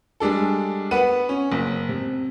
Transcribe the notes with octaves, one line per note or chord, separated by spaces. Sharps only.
G3 G#3 D4 A4
B3 B4 F#5 D#7
C#4
F#1
C3